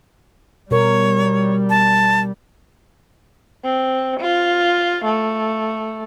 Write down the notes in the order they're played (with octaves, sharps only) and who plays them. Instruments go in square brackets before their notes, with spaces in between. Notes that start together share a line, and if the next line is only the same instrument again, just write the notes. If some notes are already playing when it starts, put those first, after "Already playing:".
[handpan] B2 A#4 [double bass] G3 [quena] C#5
[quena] A5
[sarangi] C4
F4
A3